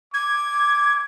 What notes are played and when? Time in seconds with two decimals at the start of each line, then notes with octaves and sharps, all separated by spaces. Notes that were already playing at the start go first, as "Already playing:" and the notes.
0.14 D6 G#6